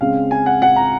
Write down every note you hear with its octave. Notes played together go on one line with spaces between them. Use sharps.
C#3 G#3 C4 F5
G#5
F#5
F#5
A#5